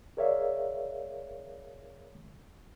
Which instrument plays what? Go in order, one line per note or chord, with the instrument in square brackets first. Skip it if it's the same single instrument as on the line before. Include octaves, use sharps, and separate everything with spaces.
[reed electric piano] G#4 A#4 C#5 D5 E5 F5